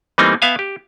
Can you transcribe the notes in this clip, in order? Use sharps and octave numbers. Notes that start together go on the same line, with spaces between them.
E3 G3 A3 A#3 C4 D#4
B3 E5 F5 G#5
G4